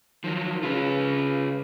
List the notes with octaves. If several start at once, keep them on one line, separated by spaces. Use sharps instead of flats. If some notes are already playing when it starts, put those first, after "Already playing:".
D#3 F3 F#3
C#3 F4 B4